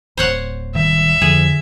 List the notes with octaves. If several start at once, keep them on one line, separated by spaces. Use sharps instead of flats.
D1 C5 C#5 F#5
D#3 F#3 G3 E5
F2 D3 G#4